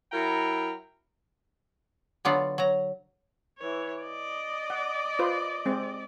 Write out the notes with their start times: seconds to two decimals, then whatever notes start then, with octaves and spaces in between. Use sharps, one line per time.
0.12 F#3 E4 A#4 G5 A#5
2.25 D3 F#3 B3 F4 D5
2.58 F#3 A#5
3.58 E3 C#5
4.02 D5 D#5
4.70 F#5
5.19 F4 B4 C5
5.66 G#3 C4